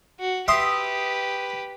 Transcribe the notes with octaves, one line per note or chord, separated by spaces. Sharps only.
F#4
G4 B4 E5 C6 D#6